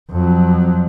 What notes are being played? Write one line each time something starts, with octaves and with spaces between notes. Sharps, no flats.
F2 F#3